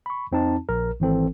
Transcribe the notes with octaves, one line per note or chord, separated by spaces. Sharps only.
B5 C#6
F2 C4 D#4 A5
A#1 A#4
G#1 E3 C4 A4